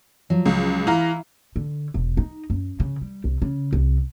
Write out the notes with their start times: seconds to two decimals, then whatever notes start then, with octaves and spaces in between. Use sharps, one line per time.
0.30 F3 F#3
0.46 C#2
0.87 E3 E4 F5 A#5
1.56 D3
1.94 E1
2.17 D#4
2.50 F#2
2.80 C#3
3.01 G3
3.24 C2
3.42 C#3
3.73 C2